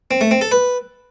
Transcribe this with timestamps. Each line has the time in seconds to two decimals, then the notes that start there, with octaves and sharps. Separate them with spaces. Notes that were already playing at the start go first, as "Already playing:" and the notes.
0.11 C4
0.21 A3
0.31 C4
0.41 A4
0.52 B4